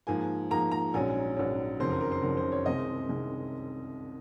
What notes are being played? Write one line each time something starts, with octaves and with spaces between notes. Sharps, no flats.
G#2 F3 A#3 G#5
G#2 F3 A#3 A#5
A#5
A#1 G#2 F#3 C#4 G#5
A#1 G#2 F#3 C#4
F#1 F2 D#3 F#3 C#4 C5
A#4
A#4
C5
F#1 F2 D#3 F#3 C#4 A#4
C5
C#5
C2 C3 D#3 G#3 C4 D#5
C2 C3 D#3 G#3 C4